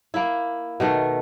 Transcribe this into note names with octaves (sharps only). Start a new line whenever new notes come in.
A#3 E4
B2 D#3 A3